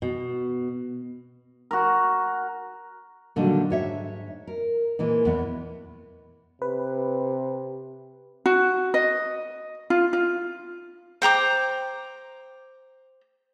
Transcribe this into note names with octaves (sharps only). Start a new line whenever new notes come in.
B2
F#4 A#4
A#2 D3 D#3 F#3 G3
G#2 C#5 E5
A#4
A#2 E3 G#3
E2 B3
C3 B4
F#4
D#5
F4
F4
C5 G5 A#5 D6